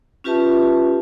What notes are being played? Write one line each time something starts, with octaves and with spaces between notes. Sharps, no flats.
C#4 F4 G4 B4 E5 A5